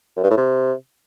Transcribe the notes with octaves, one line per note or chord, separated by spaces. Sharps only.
F#2
G2
A2
C3